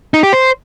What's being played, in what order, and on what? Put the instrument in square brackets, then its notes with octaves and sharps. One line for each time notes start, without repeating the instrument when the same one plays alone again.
[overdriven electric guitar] D#4
G4
C5